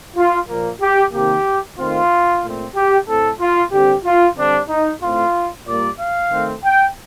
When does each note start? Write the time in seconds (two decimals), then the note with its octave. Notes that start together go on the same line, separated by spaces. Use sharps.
0.16 F4
0.48 A#2 F3 A#3
0.81 G4
1.13 C3 D#3 A#3 G4
1.78 D#3 A3 C4 F4
2.43 A#2 A3 C4
2.75 G4
3.07 A2 A3 C4 A4
3.40 F4
3.72 D3 G3 C4 G4
4.04 F4
4.36 D3 G3 C4 D4
4.68 D#4
5.01 A2 A3 C4 F4
5.66 A#2 G3 A#3 D5
5.98 F5
6.30 D#3 A3 C4
6.64 G5